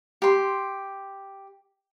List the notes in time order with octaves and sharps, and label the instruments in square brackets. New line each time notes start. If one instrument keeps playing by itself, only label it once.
[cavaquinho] G4 C6